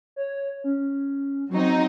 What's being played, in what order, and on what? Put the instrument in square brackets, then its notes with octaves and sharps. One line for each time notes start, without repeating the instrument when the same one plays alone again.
[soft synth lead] C#5
C#4
[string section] F#3 C4 D#4 [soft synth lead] F#4